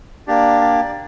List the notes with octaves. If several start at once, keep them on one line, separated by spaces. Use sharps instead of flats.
A#3 D4 G4 D5
D5